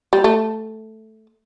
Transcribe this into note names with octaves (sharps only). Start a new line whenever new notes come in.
G3
A3